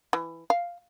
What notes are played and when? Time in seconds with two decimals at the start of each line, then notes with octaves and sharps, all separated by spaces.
0.13 E3
0.50 F5